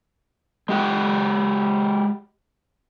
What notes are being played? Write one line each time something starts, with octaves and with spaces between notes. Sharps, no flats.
G#3 G4 F#5